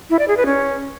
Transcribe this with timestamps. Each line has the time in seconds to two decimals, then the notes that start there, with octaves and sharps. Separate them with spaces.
0.10 E4
0.19 D5
0.28 G#4
0.37 B4
0.46 C#4